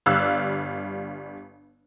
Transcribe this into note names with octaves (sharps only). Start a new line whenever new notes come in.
G1 G3 D5 F5 E6 F#6